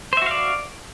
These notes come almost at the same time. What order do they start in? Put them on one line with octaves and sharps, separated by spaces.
C5 E5 F#4 F5 D5